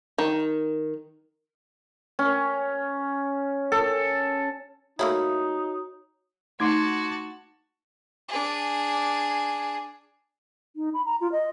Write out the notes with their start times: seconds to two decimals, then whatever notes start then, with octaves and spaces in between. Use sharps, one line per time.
0.18 D#3
2.19 C#4
3.72 A4
4.99 A3 A#3 D#4 E4 F#4 C#5
6.60 A3 D#4 F#4 A5 C6 D6 G#6
8.29 D4 G#4
10.76 D#4
10.94 B5
11.05 A#5
11.21 F4
11.32 D#5